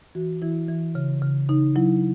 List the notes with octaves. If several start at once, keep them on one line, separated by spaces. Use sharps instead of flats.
E3 F#4
E3 E4
E3
C#3
C#3
C#3 D#4
F#3 E4